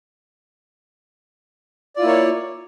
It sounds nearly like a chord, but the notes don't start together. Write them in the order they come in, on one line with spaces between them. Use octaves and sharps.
D5 F4 E4 A#3 C#5